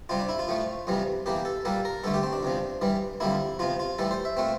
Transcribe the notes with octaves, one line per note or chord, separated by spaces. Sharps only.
C3 G3 C4 F4
D4
E4
F4
A2 F3 A3
F2 C3 E3 G3
E2 E3 A#3 G4
A4
A#2 G3 A#3 A4
A#4
G2 D3 A3 A4
G4
C4
D4
E2 C3 F3
G2 E3 G3
F2 D3 G3 A#3 E4
E2 C3 F3 F4
F4
A2 E3 G3 A4
C5
E5
A#2 A3 C4